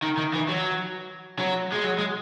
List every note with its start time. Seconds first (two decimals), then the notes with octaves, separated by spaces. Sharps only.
0.03 D#3
0.17 D#3
0.34 E3
0.48 F#3
1.39 F#3
1.72 G#3
1.84 F#3
1.99 G#3